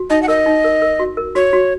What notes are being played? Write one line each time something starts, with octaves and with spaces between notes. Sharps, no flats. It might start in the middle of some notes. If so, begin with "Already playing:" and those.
Already playing: F#4
D#4 D#5
F#5
A#4 D#5
D#4
A#4
A#4
F#4
A#4
F#4 C#5
F#4